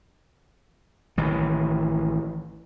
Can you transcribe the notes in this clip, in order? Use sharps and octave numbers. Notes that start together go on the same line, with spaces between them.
A1 D#3 E3